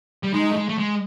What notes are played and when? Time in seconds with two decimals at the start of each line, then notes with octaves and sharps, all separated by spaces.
0.23 G3
0.33 G#3 D#4
0.51 A3
0.56 G#3
0.69 A3
0.78 G#3